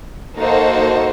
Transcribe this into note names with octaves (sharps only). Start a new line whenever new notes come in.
A#3 D#4 F#4 A4 C5